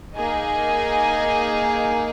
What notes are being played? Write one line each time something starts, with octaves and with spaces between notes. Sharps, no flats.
A#3 D#4 G#4 D#5 G#5